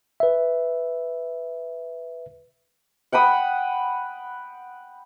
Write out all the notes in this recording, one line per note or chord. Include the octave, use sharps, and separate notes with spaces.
B4 E5
F#5 G5 B5 D#6